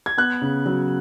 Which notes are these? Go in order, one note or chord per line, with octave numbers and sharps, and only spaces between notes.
G#6
B3 F#6
C#3
F#3